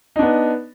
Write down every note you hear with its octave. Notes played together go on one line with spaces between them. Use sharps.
B3 D4 D#4